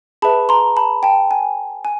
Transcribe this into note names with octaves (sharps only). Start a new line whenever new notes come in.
G#4 B4 E5 A5 B5
A#5 C6
A5 B5
G5 A5
G#5
G#5